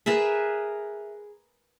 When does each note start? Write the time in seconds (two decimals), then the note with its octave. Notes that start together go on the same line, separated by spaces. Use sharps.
0.06 G#4 A#4 B4 E5